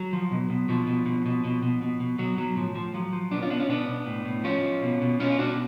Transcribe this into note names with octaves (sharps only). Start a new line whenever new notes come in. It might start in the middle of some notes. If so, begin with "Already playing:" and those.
Already playing: F#3
F3
B2
B2
B2 F3
B2
B2
B2
B2
B2
B2
B2
B2 F#3
B2 F#3
A2 F3
A2 F3
F3 F#3
F3
B2 B3 D4
C#4 F4
B2 B3 D4
C#4 F4
B2 B3 D4
B2
A2
A2
F3 C#4 F4
F3
B2
B2
B2 C#4 F4
F4
B2 D4 F#4